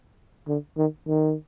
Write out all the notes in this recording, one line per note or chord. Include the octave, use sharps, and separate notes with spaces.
D3
D#3
D#3